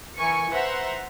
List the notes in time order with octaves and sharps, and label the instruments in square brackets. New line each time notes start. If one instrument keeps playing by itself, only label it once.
[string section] E3 A#4 G#5 C#6 C#7
B4 C5 E5 F#5 A#5 C6